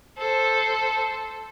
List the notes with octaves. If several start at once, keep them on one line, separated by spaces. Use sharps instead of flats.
A4 C5